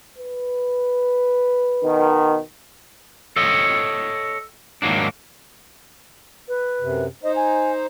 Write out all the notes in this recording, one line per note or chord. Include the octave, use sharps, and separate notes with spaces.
B4
B2 D#3
A4 C#5 D#5
G#2 D#3 F#3 A#3 D4
B4
F#2 C3
D#4 C5 D#5
G#5